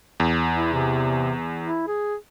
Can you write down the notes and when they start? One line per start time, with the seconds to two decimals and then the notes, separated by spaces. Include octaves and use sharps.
0.20 E2
0.55 E4
0.73 C3
1.64 E4
1.87 G#4